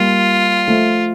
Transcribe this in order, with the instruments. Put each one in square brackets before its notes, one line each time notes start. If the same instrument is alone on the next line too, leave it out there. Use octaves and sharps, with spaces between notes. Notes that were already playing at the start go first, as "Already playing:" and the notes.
Already playing: [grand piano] G3 A#3 [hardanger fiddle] F4
[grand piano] F3 A3